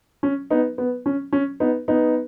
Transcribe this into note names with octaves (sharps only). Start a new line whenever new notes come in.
C#4
B3 D#4
B3
C#4
C#4
B3 D#4
B3 D#4